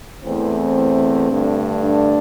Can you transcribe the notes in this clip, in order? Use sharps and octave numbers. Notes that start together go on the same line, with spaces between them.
E2 E3 A3 C4
G2 D3 A3
D4